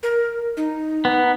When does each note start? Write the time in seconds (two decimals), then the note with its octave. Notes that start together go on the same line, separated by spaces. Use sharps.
0.03 A#4
0.57 D#4
1.05 B3